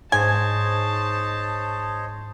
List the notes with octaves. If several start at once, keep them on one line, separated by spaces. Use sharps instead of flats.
G#2 C5 C#5 D#5 G#5 A5